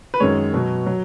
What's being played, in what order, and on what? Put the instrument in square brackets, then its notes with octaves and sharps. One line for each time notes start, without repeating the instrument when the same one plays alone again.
[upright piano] B4
F#2 D#3 G#3 C#5
B2 F#3
F#3